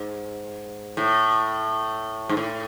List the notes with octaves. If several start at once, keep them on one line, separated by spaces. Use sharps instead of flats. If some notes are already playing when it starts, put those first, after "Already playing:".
Already playing: G#2
A2
G#2
A2